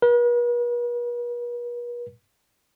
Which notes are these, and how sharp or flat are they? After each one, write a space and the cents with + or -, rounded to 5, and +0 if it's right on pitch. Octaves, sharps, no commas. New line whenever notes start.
B4 -45